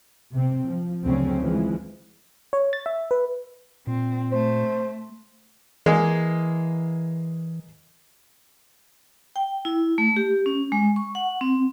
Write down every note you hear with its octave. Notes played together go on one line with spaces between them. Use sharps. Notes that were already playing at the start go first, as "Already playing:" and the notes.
C3 C4
F3
D2 C#3 F#3 C4 C#4
E3 F3 G#3
C#5
A6
E5
B4
A#2 C4
A3 C5
E3 G#3 A#3
G5
E4
A3
G4
C#4
G#3
C#6
F#5
C4